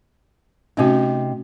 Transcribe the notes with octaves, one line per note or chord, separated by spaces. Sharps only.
C3 A3 C#4 D#4 F#4